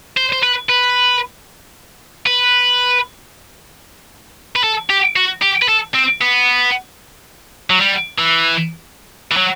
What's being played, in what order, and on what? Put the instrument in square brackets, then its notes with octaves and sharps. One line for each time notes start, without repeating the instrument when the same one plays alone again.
[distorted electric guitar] C5
C5
B4
B4
B4
B4
A4
G4
F#4
G4
B4
A4
C4
B3
F#3
G3
E3
E3
F#3